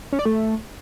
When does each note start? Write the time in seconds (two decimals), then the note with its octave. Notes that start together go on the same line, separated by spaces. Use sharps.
0.12 C#4
0.19 D5
0.25 A3